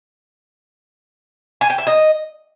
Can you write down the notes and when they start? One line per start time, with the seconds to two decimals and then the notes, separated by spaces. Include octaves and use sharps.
1.61 G#5
1.70 G5
1.78 E5
1.87 D#5